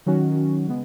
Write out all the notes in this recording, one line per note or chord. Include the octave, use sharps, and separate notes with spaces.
D#3 F#3 C#4 F#4
C#3 G#3 B3